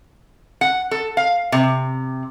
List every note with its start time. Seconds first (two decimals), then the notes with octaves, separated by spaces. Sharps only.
0.61 F#5
0.91 A4
1.17 F5
1.52 C3